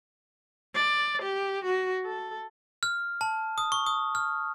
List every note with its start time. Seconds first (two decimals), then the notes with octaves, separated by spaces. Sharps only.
0.75 D5
1.22 G4
1.65 F#4
2.05 A4
2.83 F6
3.21 A5
3.58 D#6
3.72 C#6
3.86 D#6
4.15 F6